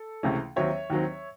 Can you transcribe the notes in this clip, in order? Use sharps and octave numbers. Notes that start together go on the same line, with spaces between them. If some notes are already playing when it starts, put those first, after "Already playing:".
Already playing: A4
C#2 C3 E3 A3 C#4
D#2 D#3 F#3 C4 C#5 E5
D#2 D#3 F#3 C4